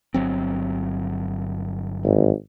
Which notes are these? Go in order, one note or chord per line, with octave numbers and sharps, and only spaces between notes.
G1 F#3 C4
G#1